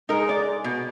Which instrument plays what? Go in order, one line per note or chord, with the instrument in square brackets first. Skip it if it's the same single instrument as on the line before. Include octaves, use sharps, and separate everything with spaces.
[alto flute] G#3 [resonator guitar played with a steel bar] D#4 A#4
[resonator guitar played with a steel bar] D5
B2